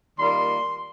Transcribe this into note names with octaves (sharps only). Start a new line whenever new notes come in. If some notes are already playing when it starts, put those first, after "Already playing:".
D#3 G3 A#3 F4 C6